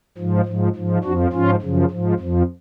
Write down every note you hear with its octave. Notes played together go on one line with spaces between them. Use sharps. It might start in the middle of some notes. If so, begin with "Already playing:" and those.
G#2 F3
G#2 F3
G#2 F3
F2 F3 D4 F#4
G#2 F3 C#4 F4
F#2 C#3 F3
G#2 F3
F2 F3